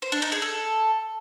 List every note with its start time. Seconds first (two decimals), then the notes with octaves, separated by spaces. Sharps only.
0.02 C5
0.12 D4
0.22 D#4
0.32 G#4
0.42 A4